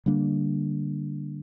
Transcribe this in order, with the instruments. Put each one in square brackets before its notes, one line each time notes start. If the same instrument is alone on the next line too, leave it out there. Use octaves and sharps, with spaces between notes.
[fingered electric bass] D3 G3 A#3 D4